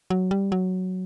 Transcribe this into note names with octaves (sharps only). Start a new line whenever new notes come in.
F#3
G3
F#3